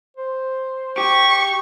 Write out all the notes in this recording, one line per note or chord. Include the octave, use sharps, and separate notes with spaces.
C5
G4 C#6